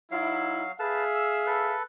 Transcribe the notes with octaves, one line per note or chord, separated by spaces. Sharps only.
F#3 D#4 E4 F5
G#4 B4 E5 F5 A5
E6
A4 B4